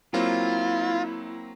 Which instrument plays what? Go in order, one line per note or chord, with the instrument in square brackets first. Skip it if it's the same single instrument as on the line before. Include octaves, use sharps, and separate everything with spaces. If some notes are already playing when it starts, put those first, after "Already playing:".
[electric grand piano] F#3 A#3 C4 [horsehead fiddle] E4 [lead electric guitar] F4